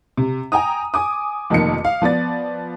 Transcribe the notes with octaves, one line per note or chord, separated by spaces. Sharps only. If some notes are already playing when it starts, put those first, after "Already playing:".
C3
G5 G#5 A#5 D#6
G#5 D6 D#6
F1 F2 D#3 A#3 C#7
F5
F3 B3 D5 A6